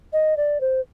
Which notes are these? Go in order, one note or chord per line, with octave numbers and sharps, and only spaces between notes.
D#5
D5
C5